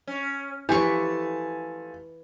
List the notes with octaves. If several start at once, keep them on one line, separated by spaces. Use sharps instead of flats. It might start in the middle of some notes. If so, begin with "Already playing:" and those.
C#4
E3 F3 A3 G4 G#5 C#6